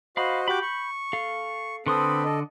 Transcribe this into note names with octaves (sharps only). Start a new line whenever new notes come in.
F#4 C5 D#5 F5 B5
F#4 G4 B5 D6 G6
C#6
A4 F5
D3 C4 A4 B4 C6 D#6
A4 D#5